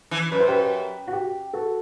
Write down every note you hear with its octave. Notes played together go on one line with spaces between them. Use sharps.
E3
F#2 B4
C5
G4 B4
F#4
G4
F#4 A4